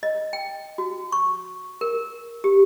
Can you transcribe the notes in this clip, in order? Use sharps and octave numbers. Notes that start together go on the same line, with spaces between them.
D#5
G5
F#4
C#6
A#4
G4